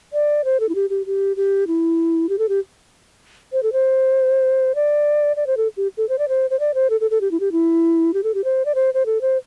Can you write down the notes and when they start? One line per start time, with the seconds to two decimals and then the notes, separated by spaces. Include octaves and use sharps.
0.13 D5
0.45 C5
0.60 A4
0.69 E4
0.75 G4
0.90 G4
1.06 G4
1.37 G4
1.67 E4
2.29 G4
2.39 A4
2.49 G4
3.53 C5
3.63 A4
3.73 C5
4.75 D5
5.36 D5
5.47 C5
5.57 A4
5.77 G4
5.97 A4
6.09 C5
6.19 D5
6.29 C5
6.50 C5
6.60 D5
6.74 C5
6.90 A4
7.01 A4
7.11 A4
7.21 G4
7.31 E4
7.40 G4
7.52 E4
8.14 G4
8.24 A4
8.34 G4
8.44 C5
8.65 D5
8.75 C5
8.94 C5
9.06 A4
9.21 C5